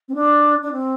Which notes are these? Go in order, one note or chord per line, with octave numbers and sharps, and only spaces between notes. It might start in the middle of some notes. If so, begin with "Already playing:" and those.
C4
D4
D4
C4